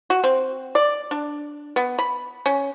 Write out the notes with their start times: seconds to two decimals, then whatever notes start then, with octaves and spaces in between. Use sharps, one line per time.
0.10 F#4
0.24 C4
0.75 D5
1.11 D4
1.76 B3
1.99 B5
2.46 C#4